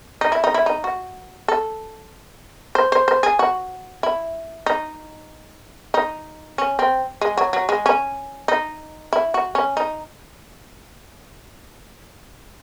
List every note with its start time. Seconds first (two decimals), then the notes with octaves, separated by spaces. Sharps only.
0.21 D#4
0.32 E4
0.44 D#4
0.54 E4
0.66 D#4
0.84 F#4
1.48 A4
2.75 C5
2.92 C5
3.08 C5
3.23 G#4
3.39 F#4
4.03 E4
4.66 D#4
5.94 D#4
6.58 C#4
6.79 C4
7.21 G#3
7.37 F#3
7.53 F#3
7.69 G#3
7.86 C#4
8.48 D#4
9.13 E4
9.34 F#4
9.55 C#4
9.77 D#4